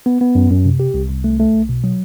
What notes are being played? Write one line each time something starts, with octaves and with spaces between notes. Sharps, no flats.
B3
B3
F#2
F#2
C3
G4
C2
C2
A3
A3
B1
B2
F#3